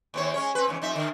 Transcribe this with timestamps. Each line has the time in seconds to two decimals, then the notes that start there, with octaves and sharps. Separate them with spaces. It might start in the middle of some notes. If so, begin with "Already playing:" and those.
0.14 D#2 C4 C#5
0.34 G#3 C#4 C#5
0.55 C4 B4
0.67 E2 G#2 C#3
0.82 F2 D#4 E5
0.95 D3 D#3